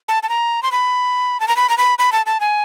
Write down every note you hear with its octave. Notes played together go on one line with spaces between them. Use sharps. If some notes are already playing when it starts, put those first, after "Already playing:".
A5
A5
A#5
C6
B5
A5
A#5
B5
A#5
B5
B5
A5
A5
G#5